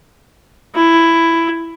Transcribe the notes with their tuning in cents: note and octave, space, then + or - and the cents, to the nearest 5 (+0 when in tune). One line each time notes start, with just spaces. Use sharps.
E4 +10